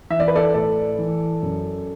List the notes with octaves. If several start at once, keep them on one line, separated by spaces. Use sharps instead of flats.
E3 E5
D5
B4
A4 D5
A2 A4 D5
E3
F#2